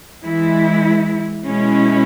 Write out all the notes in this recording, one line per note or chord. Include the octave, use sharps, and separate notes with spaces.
E3 G#3 E4
B2 G#3 C#4 E4